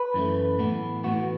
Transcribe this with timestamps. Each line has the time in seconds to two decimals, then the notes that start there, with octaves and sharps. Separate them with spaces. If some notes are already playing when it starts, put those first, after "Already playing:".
Already playing: B4
0.14 F#2 E3 A3
0.59 A2 E3 B3
1.04 A2 E3 B3 F#4